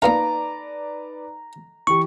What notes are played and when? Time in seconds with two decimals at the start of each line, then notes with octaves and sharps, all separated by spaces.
0.02 A#3 B3 D#4 F4 B4 D5 A#5
1.87 E3 G4 C#6